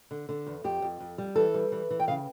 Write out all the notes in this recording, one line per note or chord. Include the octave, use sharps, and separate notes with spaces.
D3
D3
E2
F2 G4
F2
F2
G3
E3 A4
G3
E3
E3
G5
C#3 F5